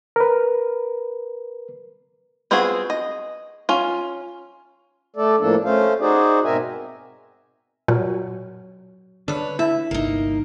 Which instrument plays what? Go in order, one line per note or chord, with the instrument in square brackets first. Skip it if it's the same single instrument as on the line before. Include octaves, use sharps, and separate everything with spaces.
[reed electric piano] A#4 B4
[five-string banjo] B3 C4 F4 F#4 G#4
D#5
C#4 F4
[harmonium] A3 A4 D5
A2 F3 A#3 D4 A4
A3 C#4 C5 F5
D#4 F#4 G#4 C5 D5
G#2 B2 C4 A#4 E5 G#5
[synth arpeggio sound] A#2 [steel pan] F#3
[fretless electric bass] D3 [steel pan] D4 [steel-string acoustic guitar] B4 C#5
[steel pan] E4 [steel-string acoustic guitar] E5
[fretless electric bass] G1 C2 D4 [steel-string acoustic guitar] A#3 D#4